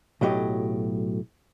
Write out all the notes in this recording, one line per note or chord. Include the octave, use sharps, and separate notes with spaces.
B1 A2 F#3 G4 D#5